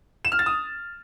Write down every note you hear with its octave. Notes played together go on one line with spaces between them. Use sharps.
E7
F6
A6
D#6